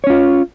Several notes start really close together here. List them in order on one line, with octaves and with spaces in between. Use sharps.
C#5 C#4 F4